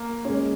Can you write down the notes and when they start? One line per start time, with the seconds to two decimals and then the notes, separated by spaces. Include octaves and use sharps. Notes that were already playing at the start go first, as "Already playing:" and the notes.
Already playing: A#3
0.25 G#3 C#4